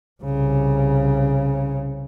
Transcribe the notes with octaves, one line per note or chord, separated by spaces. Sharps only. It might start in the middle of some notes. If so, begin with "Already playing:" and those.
C2 C#3